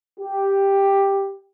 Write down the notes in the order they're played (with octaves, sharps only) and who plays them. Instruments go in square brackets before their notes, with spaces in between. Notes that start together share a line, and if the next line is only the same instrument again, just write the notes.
[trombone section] G4